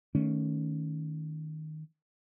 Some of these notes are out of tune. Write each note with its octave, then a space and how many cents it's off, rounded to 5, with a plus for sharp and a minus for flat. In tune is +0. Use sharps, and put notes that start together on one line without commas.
D#3 +0 A3 +0 C#4 +0